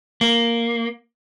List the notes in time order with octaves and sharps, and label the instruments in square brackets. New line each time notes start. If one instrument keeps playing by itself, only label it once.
[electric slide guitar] A#3